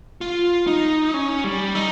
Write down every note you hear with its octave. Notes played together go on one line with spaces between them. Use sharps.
F4
D#4
C#4
G3
D#4